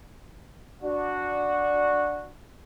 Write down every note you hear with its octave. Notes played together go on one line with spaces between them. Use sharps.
D4 F#4